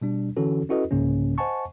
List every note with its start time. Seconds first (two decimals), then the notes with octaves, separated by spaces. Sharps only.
0.01 B2 G3 D4
0.37 D3 E3 C#4 F#4 A4
0.69 C#4 E4 F#4 A4 B4 D#5
0.91 C2 G#2 C#3 A#3 C#4
1.38 C5 D#5 F#5 G#5 A5 C#6